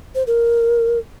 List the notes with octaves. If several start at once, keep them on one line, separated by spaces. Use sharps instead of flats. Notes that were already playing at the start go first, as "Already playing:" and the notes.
C5
A#4